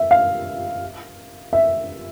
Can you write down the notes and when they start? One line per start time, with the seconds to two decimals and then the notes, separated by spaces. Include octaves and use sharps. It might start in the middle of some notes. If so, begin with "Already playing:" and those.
Already playing: E5
0.11 F5
1.53 E5